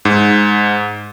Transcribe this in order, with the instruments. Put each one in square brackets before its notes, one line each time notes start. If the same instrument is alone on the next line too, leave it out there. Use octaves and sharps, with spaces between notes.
[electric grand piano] G#2